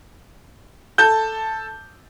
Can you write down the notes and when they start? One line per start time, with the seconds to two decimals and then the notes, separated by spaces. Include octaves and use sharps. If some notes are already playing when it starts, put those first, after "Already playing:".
0.98 A4 A5 G6